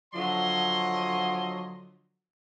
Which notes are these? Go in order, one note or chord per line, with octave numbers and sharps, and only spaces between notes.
D3 F3 F#3 C#5 D#5 C6